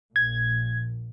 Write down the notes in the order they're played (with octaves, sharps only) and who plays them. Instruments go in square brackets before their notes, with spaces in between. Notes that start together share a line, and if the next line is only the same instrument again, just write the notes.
[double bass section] A#1 A#2 [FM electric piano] G#6